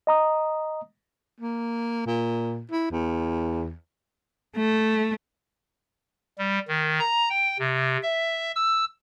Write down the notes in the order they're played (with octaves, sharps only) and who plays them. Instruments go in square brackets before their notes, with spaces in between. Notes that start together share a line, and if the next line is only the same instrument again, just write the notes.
[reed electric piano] D#5 A#5 D#6
[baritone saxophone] A#3
A#2
E4
E2
[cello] A3
[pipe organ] G3
D#3
A#5
G5
C3
E5
E6